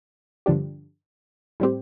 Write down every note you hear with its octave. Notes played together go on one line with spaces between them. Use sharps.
G2 D3 F3 D4 G4
A2 G3 C4 G4